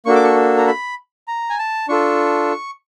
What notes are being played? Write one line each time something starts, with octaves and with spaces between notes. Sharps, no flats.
A#3 D4 F#4 A4 C#6
D6
C#6
A#5
B5
A#5
G#5
A5
D4 F4 A4 C#6